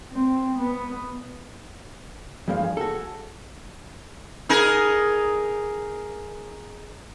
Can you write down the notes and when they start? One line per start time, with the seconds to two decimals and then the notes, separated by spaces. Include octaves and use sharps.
0.11 C4
0.58 B3
2.48 E2 G2 F3 G#3
2.64 G#4
2.77 F#4 A4
4.49 D#4 G#4 A#4